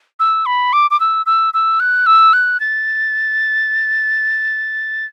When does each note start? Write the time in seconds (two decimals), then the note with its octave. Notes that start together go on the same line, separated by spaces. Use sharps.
0.19 E6
0.46 B5
0.73 D6
0.91 D6
1.00 E6
1.26 E6
1.54 E6
1.80 F#6
2.06 E6
2.33 F#6
2.60 A6